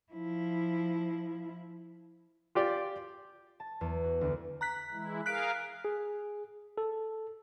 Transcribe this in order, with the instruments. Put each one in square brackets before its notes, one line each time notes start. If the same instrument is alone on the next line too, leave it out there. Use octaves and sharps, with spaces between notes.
[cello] F3 E4
[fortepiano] F4 G4 D5
[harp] A5
E2
F#4
D2
[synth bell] A#5 F#6 B6
[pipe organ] E3 G#3 E4
[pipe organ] G#4 A#4 F5 [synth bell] F#6 B6 D7
[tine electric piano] G#4
A4